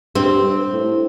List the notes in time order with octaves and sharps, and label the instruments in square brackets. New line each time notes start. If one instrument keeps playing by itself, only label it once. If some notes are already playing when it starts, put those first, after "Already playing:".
[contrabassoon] G2 [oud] C4
[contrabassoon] A2